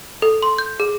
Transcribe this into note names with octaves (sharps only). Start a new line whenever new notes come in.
A4
C6
G6
G#4